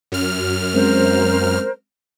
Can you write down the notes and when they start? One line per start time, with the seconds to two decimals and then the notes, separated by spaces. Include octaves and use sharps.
0.12 F#2 F6
0.74 G#3 C4 C#4 A#4 C5